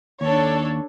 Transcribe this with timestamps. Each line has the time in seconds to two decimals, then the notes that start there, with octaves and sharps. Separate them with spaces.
0.21 D#2 D4 A4 C#5